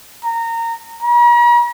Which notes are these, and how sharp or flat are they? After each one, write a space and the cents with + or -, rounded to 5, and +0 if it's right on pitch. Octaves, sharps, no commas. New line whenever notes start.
A#5 -20
A#5 +45